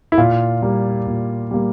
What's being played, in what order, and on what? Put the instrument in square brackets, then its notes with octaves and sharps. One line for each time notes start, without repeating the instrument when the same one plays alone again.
[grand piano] E4
A#2 F4
G3 A#3
A#2
G3 A#3